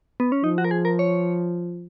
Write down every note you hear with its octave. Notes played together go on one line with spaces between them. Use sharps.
B3
C#4
F3 D#4
F#4
A#4
G#4
A#4
C#5